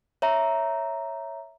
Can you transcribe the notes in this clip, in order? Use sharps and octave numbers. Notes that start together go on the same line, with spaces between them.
C#5 E5 A#5